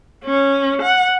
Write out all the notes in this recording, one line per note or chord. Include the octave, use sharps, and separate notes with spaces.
C#4
F#5